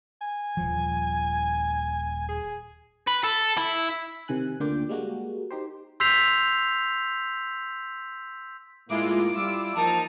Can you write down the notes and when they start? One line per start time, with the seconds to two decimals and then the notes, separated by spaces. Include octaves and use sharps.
0.21 G#5
0.57 D#1 F3
2.28 G#4
3.07 B4
3.24 A4
3.57 E4
4.28 C3 D#3 G#5 F#6
4.60 D2 D3 A#3 F4 G5 D6
4.89 G3 G#3 A#3 F#4
5.50 D#4 G4 C5
6.00 C6 E6 G6 B6 C7 F7
8.90 A2 G#3 A#3 E4 F4 D6
9.34 G3 E4 F4 E6
9.77 F3 A#3 D#4 F4 A#4 A5